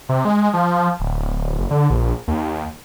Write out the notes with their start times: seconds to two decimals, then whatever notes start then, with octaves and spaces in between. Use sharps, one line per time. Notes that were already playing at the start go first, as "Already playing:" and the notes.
0.09 C3
0.25 G#3
0.54 F3
1.00 D1
1.59 F#1
1.70 D3
1.90 A#1
2.28 D#2